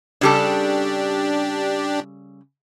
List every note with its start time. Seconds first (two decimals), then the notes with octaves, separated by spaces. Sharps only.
0.21 C#3 G3 D4 G4 A4